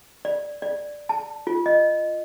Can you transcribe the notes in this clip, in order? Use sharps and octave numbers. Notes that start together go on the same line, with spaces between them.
D5
D5
A5
F4
D#5